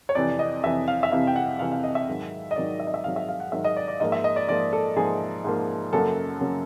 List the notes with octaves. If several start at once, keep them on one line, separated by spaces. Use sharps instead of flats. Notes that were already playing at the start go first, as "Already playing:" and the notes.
C#5
F2 C3 E3 D5
D#5
F2 C3 E3 E5
F5
E5
F2 C3 E3 F5
G5
F#5
F2 C3 E3 F5
F5
D#5
E5
G#2 D#3 F#3
D#5
G#2 D#3 F#3 D5
E5
D#5
E5
G#2 D#3 F#3 F5
E5
F5
F#5
G#2 D#3 F#3 E5
D#5
D5
D5
G#2 F3 A#3 D#5
E5
D#5
D5
G#2 F3 A#3 D5
A4
G#2 F3 A#3 G#4
G#2 F3 A#3
F#2 C#3 F#3 A#3 A4
C#3 F#3 A#3